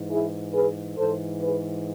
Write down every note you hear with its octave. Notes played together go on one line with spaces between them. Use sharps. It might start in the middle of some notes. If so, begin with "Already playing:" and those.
Already playing: G#2 E3
E4 G#4
G#4 B4
G#2 E3 A4 C5
G#4 B4